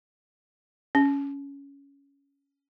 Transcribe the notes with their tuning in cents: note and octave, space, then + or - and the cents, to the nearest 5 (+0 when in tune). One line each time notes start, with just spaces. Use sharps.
C#4 +10